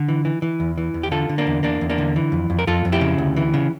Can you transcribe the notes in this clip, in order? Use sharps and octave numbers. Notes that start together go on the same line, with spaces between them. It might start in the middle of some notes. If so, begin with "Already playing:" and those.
Already playing: D3
E3
E3
E3
E2
E3
E2
G4
D3 F4 A4
D3
A#3 D4
E2
E2 A#3 D4
E2
A#3 D4
D3
E3
F2
F2
A#4
F2 F4 A4
F2
E4 G4
C#3
D2
E3
C#3